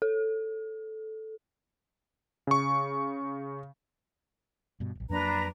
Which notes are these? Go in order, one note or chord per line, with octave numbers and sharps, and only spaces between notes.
A4
C#3 C#6
G2 B2
D1 A#1
F2 F#3 A#3 D4 B4 A#5